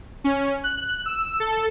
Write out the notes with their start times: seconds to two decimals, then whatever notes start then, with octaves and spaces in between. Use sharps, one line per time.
0.24 C#4
0.64 F#6
1.06 E6
1.40 A4